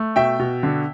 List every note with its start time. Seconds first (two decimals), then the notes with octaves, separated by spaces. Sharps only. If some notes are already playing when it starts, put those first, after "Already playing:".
Already playing: A3
0.16 B2 E5 G5
0.39 B2
0.63 D3